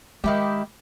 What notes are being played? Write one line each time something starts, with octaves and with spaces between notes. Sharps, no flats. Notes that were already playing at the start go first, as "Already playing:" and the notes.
D#3 G#3 E4 G4